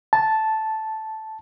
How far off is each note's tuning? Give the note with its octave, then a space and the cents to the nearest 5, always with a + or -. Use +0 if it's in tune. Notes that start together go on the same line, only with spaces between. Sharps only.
A5 -5